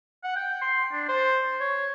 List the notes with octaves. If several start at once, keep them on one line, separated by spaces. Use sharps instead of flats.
F#5
G5
C6
D4
C5
C#5